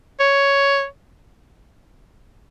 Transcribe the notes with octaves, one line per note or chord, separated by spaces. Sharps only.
C#5